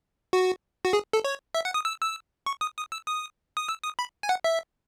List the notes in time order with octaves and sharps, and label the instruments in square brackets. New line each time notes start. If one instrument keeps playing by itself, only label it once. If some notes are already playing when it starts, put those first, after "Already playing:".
[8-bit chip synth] F#4
F#4
G#4
A4
C#5
E5
F#5
D#6
E6
E6
C#6
D#6
D#6
E6
D#6
D#6
E6
D#6
B5
G#5
F#5
E5